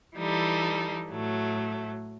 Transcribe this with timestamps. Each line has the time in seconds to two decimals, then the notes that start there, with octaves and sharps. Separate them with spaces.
0.18 E3 G3 D#4 A4
1.12 A2 F#3 A3